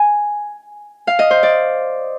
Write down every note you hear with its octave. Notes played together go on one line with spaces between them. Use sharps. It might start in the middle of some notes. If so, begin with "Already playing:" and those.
Already playing: G#5
F5
D#5
C5
D5